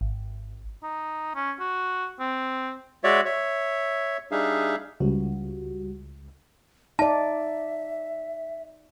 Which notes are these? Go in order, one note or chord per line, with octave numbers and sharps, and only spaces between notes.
G#1
D#4
C#4
F#4
C4
G#3 F#4 C#5 D5 E5
C#5 E5
G3 D4 D#4 G#4 E5 F5
C#2 G3 F#4
D#4 D5 E5 A5